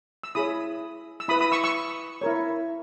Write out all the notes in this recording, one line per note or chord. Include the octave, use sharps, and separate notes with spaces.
E6
E4 G#4 C#5 B5 D#6
E6
E4 B4 B5 D#6
B5 D#6
C#6 E6
C#6 E6
E4 A#4 C#5